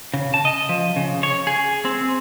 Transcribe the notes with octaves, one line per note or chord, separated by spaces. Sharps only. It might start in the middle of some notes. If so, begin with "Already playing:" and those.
C#3
A5
D#5
F3
C#3
C#5
G#4
C4